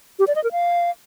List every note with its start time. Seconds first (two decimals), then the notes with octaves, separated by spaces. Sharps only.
0.19 G4
0.27 D5
0.36 D#5
0.44 A#4
0.52 F5